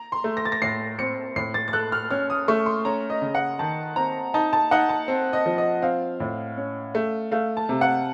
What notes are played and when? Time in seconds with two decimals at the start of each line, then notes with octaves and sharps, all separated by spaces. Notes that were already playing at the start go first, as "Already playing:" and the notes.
Already playing: A#5
0.12 C6
0.24 A3
0.37 A#6
0.45 A6
0.52 A#6
0.62 A2 C7
0.99 C4 C#7
1.36 A2 C7
1.54 A6
1.68 A6
1.73 A4 F#6
1.92 F6
2.11 C#4 F6
2.30 D#6
2.48 A3 C#6
2.66 C6
2.85 C#4 A#5
3.10 D#5
3.22 C#3
3.35 F#5
3.59 D#3 A5
3.96 C4 A#5
4.34 D#4 A5
4.53 A5
4.71 D#4 F#5
4.89 A5
5.08 C4
5.33 D#5
5.46 F3
5.58 D#5
5.82 C4 F5
6.20 A2
6.57 C#4
6.95 A3
7.31 A3 F5
7.57 A5
7.69 C3
7.81 F#5